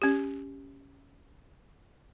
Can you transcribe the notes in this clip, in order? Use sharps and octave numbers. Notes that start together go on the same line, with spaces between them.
C#4 G4